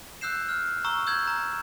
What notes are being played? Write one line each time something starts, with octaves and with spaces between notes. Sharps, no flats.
E6 F#6 G6 C7 E7
F6
A#5 C#6 E6
E6 G6 G#6 F#7
A#5